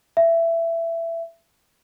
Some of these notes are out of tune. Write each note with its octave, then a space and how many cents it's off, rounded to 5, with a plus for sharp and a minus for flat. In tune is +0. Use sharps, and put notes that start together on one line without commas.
E5 +20